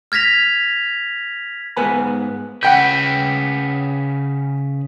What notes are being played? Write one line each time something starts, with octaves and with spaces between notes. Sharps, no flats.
F6 G#6 A#6 B6 F7
G#2 B3 B4 G#5 A#5 B5
C#3 B4 F#5 G5 G6